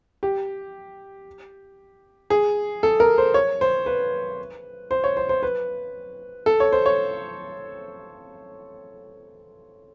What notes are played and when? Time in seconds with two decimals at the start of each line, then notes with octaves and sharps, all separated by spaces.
0.23 G4
2.30 G#4
2.83 A4
3.00 A#4
3.18 C5
3.34 C#5
3.61 C5
3.86 B4
4.91 C5
5.04 C#5
5.17 C5
5.29 C5
5.43 B4
6.46 A4
6.60 C#5
6.73 C5
6.86 C#5